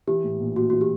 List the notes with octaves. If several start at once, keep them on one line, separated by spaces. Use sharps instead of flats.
E3 G4
A2
A#1
A#1 F#4
E3 F#4
G4